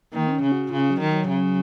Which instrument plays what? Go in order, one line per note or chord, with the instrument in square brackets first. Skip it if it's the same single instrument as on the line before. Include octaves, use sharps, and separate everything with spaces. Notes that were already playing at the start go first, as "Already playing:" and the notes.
[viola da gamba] D#3 [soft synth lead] A#3
[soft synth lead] C4
C#4
[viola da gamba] C#3
[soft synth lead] F#4
[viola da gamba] C#3 [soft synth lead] F4
[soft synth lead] F#3
[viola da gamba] D#3
[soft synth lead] F#3
[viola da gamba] C#3